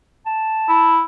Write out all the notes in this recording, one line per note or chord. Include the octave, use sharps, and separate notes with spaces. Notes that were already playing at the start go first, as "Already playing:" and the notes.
A5
E4